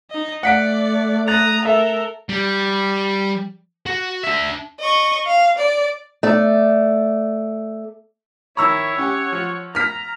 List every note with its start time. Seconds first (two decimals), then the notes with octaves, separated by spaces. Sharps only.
0.11 D#4 D#5
0.43 A3 D5 F#5 B6 D7
1.28 A#5 D#6 F#6 A6 F7
1.65 A4 A#4 E5
2.29 G3
3.86 F#4
4.24 D4 E5
4.80 D#5 C#6
5.27 F5
5.58 D5
6.23 A3 D5
8.57 D#3 E4 C#5 A#5 B5 C#6 E6
8.98 C#4 G4 F#5
9.32 F3
9.75 A#5 F6 B6